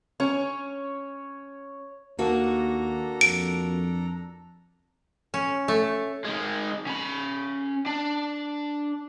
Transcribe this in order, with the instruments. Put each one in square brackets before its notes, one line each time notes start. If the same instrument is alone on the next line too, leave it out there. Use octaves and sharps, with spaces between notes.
[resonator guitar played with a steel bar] C#4 [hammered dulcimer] C#5
[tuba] D#2 [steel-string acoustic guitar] A#3 F#4 [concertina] D4 A4 A#5
[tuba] F2 [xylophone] D7
[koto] C#4
A3
[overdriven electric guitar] D#3 G#3
C#4 B5
D4